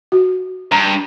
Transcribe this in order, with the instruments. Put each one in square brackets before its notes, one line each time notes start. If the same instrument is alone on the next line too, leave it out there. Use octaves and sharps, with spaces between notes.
[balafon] F#4
[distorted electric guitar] G2 [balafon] A#5